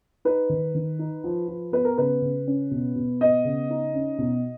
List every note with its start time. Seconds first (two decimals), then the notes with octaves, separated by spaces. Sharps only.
0.25 D#4 B4
0.49 D#3
0.75 D#3
0.99 D#4
1.24 F3
1.48 F3
1.72 B3 B4
1.85 A#4
1.98 C#3 B4
2.22 C#3
2.47 C#4
2.71 B2
2.96 B2
3.21 B3 D#5
3.45 C#3
3.70 D#4
3.95 C#4
4.18 B2